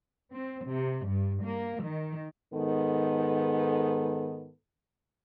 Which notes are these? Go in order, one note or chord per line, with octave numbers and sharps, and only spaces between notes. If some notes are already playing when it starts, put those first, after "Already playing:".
C4
C3
G2
A#3
D#3
G#2 D#3 B3 A4